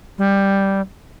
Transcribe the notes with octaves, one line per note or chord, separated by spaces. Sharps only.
G3